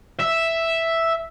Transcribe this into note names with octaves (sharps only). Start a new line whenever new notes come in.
E5